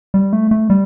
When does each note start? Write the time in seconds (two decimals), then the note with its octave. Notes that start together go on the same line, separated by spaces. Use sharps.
0.14 G3
0.33 A3
0.51 A3
0.70 G3